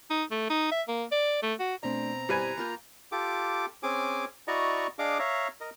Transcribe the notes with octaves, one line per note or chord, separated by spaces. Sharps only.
D#4
A3
D#4
E5
A#3
D5
A3
F#4
B2 A3 C4 D4 D5 A#5
G3 E4 G4 B4 C5 G#5
A#3 F4 A#4 B5 G6
F4 G4 A4 D6
C4 C#4 G#4 G#5 D6
E4 F#4 D5 D#5 A#5 C#6
D4 G#4 D#5 F5 D6
C#5 E5 F5 A#5
A#4 D#5